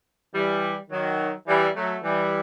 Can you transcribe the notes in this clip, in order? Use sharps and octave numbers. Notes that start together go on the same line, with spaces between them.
E3 G3
D#3 F#3
E3 G3
F#3 A3
E3 G3